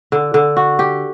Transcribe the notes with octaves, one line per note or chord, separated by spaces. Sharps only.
D3
D3
F#4
G4